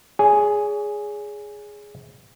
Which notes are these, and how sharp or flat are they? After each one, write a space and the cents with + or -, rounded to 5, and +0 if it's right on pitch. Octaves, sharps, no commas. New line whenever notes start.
G#4 +0 C#5 +45 G#5 +0